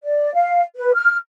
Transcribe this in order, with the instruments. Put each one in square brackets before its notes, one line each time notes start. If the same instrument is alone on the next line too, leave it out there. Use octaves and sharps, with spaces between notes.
[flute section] D5
F5
B4
F6